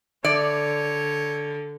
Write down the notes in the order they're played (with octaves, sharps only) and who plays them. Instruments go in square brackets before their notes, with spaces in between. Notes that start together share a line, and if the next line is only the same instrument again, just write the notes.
[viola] D3 [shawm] C#5 [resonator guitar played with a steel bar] D5